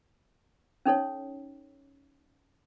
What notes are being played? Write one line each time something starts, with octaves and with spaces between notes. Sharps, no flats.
C#4 D#4 A4 C#5